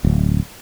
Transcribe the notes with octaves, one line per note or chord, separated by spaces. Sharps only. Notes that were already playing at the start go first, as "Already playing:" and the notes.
D1